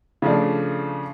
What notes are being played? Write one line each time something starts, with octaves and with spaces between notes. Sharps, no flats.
C#3 F3 A3 D4